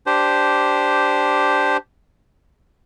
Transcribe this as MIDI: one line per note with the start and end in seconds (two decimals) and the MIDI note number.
0.06 1.77 62
0.06 1.77 67
0.06 1.77 72